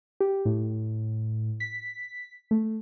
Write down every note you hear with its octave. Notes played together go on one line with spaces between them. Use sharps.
G4
A2
B6
A3